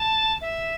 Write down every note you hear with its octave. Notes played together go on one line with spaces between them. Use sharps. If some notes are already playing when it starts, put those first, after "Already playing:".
Already playing: A5
E5